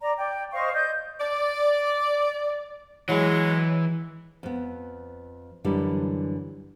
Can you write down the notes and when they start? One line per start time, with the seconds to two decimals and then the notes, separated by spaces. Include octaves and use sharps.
0.01 D5 A#5
0.18 D5 G5
0.53 C5 D#5 F5 C#6
0.73 D5 D#5 G6
1.20 D5
3.09 E3 F#3 G#3
4.43 F2 B3
5.64 F#2 D3 E3 G3